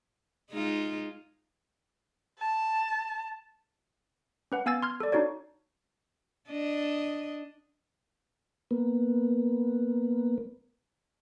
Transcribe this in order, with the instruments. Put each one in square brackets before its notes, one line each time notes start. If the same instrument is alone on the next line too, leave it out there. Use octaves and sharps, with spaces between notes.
[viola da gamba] G#3 D#4 F4
[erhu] A5
[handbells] C#4 B4 F#5
B3 F5 G#5 E6 G#6 A6
C6 F6 G#6
A4 D5
D4 D#4 F#4 C#5 D5
[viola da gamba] D4 D#5
[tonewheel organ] A#3 B3